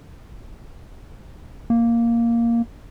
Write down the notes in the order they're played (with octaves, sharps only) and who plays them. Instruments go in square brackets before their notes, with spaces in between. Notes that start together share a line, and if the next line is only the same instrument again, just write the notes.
[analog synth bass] A#3